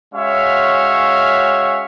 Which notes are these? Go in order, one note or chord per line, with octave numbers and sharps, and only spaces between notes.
G#3 C#4 F#4 C#5 E5 F5